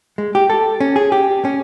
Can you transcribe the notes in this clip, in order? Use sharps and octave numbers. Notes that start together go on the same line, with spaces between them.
G#3
G4
A4
C#4
G#4
G4
C#4